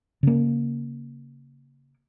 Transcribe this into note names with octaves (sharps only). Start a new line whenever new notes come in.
C#3 A#3